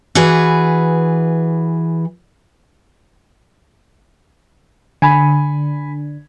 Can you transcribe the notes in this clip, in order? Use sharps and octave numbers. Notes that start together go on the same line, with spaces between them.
E3 F#4 G#4 B4
D3 G#5 B5